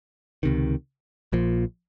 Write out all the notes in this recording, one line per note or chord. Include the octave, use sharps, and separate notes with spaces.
C#2 C3 D#3
A#1 A#2 F3